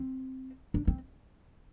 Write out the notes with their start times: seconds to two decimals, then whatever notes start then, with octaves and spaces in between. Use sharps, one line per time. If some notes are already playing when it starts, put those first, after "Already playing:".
Already playing: C4
0.74 D4
0.87 C4